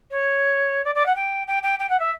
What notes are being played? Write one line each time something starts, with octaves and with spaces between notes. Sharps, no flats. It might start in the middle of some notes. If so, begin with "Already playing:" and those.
C#5
D5
D5
F#5
G5
G5
G5
G5
F#5
E5